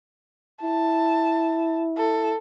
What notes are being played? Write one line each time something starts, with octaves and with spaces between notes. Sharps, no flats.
E4 A5
A4